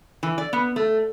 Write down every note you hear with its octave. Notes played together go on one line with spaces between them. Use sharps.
E3
D5
B3
A3